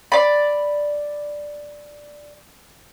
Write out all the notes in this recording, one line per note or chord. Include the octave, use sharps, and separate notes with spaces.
D5 B5